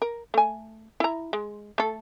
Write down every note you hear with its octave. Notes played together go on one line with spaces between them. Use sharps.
A#4
A3 G#5
E4 A#5
G#3
A3 A4